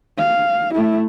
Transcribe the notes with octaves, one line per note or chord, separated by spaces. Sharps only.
F5
A3 E4